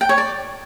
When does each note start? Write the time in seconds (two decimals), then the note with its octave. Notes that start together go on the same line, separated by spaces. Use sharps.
0.01 G5
0.09 C#5
0.18 D5